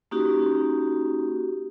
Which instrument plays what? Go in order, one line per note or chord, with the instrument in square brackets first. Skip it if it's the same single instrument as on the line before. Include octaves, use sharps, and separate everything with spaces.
[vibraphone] A#3 C#4 D#4 F#4 G4